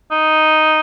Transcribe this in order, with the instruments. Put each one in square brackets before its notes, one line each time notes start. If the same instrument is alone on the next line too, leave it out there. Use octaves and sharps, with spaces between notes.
[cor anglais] D#4